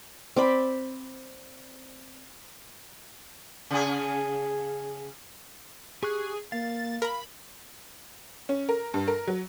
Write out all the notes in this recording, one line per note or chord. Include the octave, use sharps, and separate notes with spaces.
C4 D5 B5
C#3 G#4
G4 G#4 C#6 F#6
A#3 F5 A6
A#4 A#5 B5
C#4
A#4
G2
A#4
F#3